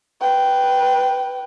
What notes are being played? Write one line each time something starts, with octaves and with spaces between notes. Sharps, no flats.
B4 G5